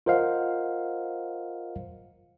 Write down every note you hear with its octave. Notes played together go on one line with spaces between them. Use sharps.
F4 A#4 C5 D#5 F5 F#5